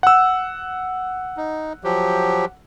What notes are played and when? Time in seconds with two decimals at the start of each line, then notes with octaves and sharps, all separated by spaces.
0.03 F#5 E6
1.37 D#4
1.84 F3 F#3 G4